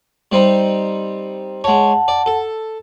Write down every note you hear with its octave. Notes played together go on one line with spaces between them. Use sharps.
G3 C4 D#4
G#3 C#5 F#5 A5
D5
A4